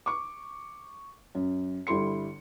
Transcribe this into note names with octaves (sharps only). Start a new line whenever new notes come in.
C#6 D6
F#2
G1 G3 E4 A4 C6 C#7